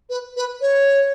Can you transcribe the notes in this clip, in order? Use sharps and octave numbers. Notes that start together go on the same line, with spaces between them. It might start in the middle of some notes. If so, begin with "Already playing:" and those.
B4
B4
C#5